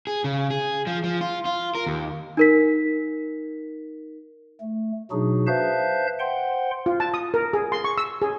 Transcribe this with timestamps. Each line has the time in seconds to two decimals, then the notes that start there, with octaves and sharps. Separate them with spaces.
0.07 G#4
0.24 C#3
0.50 G#4
0.87 F3
1.04 F3
1.21 F4
1.45 F4
1.75 A#4
1.86 D#2
2.37 D#4 A#4 B6
4.60 A3
5.11 B2 F#3 D4 D#4 F#4 G#4
5.47 B4 C5 E5 F5 A5 G6
6.19 C5 F#5 G5 C6
6.86 F4
7.00 A5
7.14 D#6
7.34 A#4
7.53 G#4
7.72 C6
7.84 C#6
7.98 E6
8.22 G#4